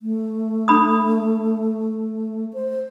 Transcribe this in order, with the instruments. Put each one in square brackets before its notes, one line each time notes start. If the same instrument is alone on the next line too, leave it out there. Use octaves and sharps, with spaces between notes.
[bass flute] A3
[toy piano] D4 B5 D#6
[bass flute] C5